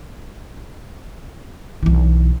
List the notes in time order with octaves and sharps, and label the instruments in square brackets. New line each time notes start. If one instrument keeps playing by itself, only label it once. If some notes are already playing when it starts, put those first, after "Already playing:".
[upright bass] B1 E3